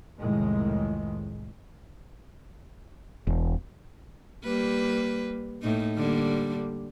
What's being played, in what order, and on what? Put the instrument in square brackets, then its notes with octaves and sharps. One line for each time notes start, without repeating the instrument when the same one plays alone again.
[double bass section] C2 F2 A2 D#3 G#3
[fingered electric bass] E1
[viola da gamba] G3 A#3 B4
A2 A#3 D#4
D3 G3 A#3